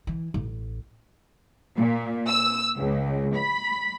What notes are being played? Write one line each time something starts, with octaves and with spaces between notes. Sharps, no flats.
E3
A1
A#2
E6
C#2
B5